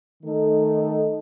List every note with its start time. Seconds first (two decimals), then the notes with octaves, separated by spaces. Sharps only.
0.23 D#3 A3 D#4 A4 D#5